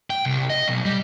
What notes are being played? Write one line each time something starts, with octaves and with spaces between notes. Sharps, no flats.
G5
C2
D#5
B1
G3